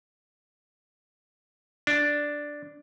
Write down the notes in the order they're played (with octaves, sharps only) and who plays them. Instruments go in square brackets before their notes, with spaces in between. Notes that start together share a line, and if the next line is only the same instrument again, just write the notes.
[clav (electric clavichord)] D4